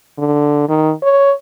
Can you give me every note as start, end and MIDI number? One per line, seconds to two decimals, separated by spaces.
0.18 0.65 50
0.69 0.92 51
1.03 1.33 73